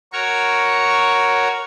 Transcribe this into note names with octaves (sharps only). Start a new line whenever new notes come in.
F#4 A#4 C#5 C#6